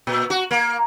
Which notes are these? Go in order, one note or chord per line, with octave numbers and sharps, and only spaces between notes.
A#2
F#4
A#3